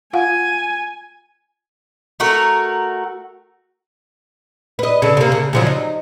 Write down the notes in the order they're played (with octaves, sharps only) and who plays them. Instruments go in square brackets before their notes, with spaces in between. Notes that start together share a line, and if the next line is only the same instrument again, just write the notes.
[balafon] F4 F5 F#5 [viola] G#5
[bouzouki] A3 F#4 A#4
[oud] B4 D#5
C#3 A4
C3 A#3
C#3
C#3 F3 F#3
D#4